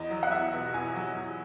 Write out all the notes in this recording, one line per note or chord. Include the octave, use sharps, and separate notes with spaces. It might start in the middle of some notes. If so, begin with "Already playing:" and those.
Already playing: E2 D#5
F#3
F#5
E2 E5
B2
E2 G#5
F#3
E2